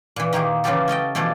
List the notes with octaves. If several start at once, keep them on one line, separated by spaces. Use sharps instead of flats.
A#2 E3
D#3 A#3 G4 G#4
C#3 E3 F#3 F4 G4 A4
C#4 A4 D#5 G5
B2 E3 F3 A3 D5